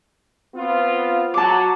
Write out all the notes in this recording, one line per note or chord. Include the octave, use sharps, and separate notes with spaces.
B3 C4 F4
F#3 A5 D6